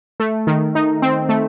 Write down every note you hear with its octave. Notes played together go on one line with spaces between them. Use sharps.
A3
D#3
D#4
C4
A3